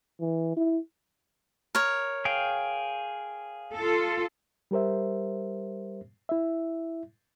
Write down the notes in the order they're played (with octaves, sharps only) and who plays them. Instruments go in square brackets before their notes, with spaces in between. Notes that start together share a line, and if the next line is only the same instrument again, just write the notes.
[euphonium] E3
E4
[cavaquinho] A#4 C#5
[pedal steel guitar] G#4 F5 G5
[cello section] F4 A4
[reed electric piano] G3 G4 A#4 C5 E5
E4 E5